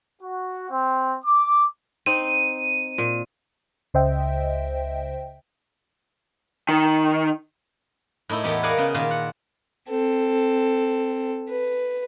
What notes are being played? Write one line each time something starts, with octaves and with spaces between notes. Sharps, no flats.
F#4
C4
D6
C4 D#4 D#7
A#2
C#2 C#3 C5 D#5 E5 G5
D#3
A2 D#4 E4
E2 A2 B3 G4
G#4 A#4 D5 F5 F#5 G#5
C#3 B3
A#2 D#3 D#5 F5
F#5
C4 A4
B4